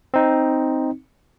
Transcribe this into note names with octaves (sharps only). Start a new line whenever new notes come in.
C4 D#4